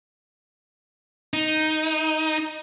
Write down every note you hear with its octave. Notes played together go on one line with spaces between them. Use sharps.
D#4